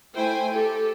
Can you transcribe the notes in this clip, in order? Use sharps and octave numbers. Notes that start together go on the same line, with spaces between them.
A3 E4 C5 G5 G#5
G4 A4